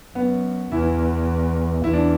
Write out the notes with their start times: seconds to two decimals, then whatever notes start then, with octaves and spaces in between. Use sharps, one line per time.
0.15 F#2 B3
0.72 E2 E3 E4
1.84 E2 E4
1.94 D4